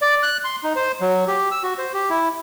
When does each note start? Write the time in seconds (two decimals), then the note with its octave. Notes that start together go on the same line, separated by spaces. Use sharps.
0.02 D5
0.23 F#6
0.44 C6
0.64 D#4
0.76 C5
1.01 F#3
1.28 G4
1.51 E6
1.63 F#4
1.78 C5
1.94 G4
2.10 E4